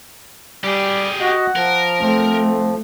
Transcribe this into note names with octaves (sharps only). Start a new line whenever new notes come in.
G3 G4 G#4
F#4 D#5 F#5
F3 A#4
A3 C4